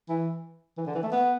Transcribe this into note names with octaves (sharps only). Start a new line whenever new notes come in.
E3
E3
D3
E3
A3
B3